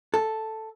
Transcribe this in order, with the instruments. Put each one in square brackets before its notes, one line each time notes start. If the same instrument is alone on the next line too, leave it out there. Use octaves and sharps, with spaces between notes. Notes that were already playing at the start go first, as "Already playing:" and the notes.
[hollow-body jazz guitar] A4